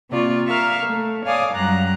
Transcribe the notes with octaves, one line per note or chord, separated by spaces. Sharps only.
C3 A#3 F4 D5 C#6
A#4 E5 F5 C#6 F6
A3
C#5 D5 F5 G#5 D6 D#6
F#2 G3 A#5 F#6